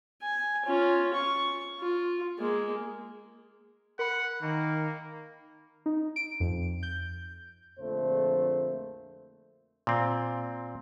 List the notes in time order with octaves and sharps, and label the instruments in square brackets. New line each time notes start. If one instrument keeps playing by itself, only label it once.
[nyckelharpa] G#5
C#4 F4
C#6
F4
G#3 A#3
[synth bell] A#4 B5 [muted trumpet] F#5
[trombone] D#3 [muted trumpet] A#3
[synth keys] D#4
D7
F2
G6
[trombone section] A#1 F2 D3 A3 A#3 C5
[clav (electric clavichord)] A#2 C4